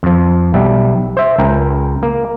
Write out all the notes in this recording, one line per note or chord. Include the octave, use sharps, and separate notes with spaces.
F2 F3
B1 G3 E5
C5 E5
C#2 A#4 G5
A#3